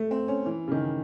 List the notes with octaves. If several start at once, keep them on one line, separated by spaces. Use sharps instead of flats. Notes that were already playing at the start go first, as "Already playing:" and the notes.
Already playing: A3
C4
C#4
E3
C#3
D#3